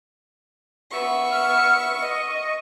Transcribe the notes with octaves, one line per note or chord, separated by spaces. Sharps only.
B3 E5 C#6
F6
D#5